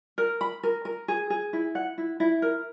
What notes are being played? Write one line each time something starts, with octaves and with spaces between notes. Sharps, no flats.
A#4
B5
A#4
A#4
G#4
G#4
E4
F#5
E4
E4
A#4